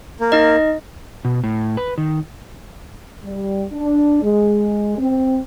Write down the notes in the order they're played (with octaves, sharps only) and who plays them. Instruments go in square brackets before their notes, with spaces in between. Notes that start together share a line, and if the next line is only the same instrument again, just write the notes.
[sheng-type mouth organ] A#3
[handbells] D#4 D#5
[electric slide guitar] B2
A2
B4
D#3
[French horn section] G3
D4
G#3
C4